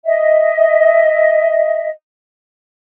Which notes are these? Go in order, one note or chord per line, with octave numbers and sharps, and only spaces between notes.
D#5 E5